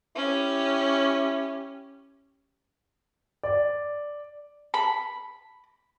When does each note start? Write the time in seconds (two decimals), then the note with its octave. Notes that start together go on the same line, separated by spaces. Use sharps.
0.16 C#4 E4 G4
3.43 D5
4.74 B5